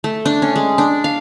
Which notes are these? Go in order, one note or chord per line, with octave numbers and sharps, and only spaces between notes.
A3
D4
C#4
G#3
D4
F5